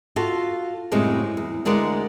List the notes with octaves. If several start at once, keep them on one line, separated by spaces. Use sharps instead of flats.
F4 F#4 A4
F#2 A2 C#3 G3 G#3 C4
E2
D2 D3 G#3 A#4 D5 F#5